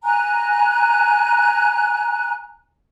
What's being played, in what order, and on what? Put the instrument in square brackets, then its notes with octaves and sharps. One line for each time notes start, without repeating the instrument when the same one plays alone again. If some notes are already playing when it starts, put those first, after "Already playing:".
[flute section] G#5 A#5 F#6